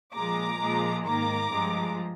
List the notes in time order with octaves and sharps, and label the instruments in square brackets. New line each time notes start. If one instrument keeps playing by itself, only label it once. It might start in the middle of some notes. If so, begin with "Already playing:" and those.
[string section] A#2 F3 G#3 A#5 D6
A#2 F3 G#3
G#2 D#3 A#3 A#5 D6
G2 F3 G#3